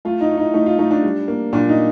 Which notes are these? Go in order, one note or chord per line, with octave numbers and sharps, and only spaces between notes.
A3 F4
D#4
A2
D#4
A3 D#4
F4
A3 D#4
D4
G3
A#3
A#2 D4
D#4